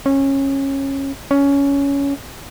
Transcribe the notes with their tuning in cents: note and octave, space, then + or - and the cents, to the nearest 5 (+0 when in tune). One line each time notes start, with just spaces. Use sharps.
C#4 -20
C#4 +15